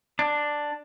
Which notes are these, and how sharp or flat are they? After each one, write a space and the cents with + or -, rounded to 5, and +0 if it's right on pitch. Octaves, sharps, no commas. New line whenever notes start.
D4 +5